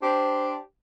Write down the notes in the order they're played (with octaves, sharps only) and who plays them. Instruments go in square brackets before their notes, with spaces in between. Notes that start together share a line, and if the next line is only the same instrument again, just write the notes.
[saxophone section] D4 G4 C5